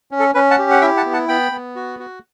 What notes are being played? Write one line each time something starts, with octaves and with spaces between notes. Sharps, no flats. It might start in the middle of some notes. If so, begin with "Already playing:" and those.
C#4
A4
C#4 B4
F#5 A5
G4
F#5
E4 E5 G5
F#5 A5
B3
F#5 A5
B3 G5 B5
B3
F#4
F#4